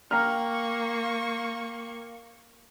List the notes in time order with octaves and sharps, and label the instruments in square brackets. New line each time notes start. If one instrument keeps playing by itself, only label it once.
[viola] A#3 C#6 [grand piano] G5 A#5 F6